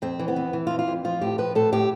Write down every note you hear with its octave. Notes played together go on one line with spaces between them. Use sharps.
F2 C4
E3
B3
E3
E3
F4
F2
F4
F2
F3 F4
A2 G4
F3 B4
A2 A4
A2 G4